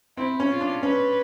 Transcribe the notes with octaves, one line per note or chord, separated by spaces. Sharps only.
C4 E4
C#4
F4
D4
C#4 B4